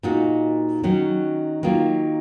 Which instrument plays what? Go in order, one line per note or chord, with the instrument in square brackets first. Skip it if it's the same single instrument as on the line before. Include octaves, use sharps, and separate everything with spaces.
[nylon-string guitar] A#2 G#3 D#4 F#4
D#3 F#3 C#4 F#4
D#3 F#3 A#3 F4